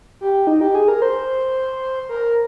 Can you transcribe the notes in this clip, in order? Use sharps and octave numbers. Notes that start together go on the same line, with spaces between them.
G4
D#4
G4
G#4
A#4
C5
A#4